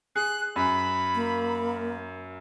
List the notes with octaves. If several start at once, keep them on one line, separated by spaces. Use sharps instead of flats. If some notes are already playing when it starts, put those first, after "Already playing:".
G#4 F#6
F#2 B5
A#3